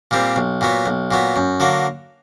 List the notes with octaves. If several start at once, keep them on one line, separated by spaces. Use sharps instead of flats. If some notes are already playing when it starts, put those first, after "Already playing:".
A#2 G3 C4
B1
A#2 F#3 B3
B1
A#2 F#3 B3
F#2
D3 F#3 A#3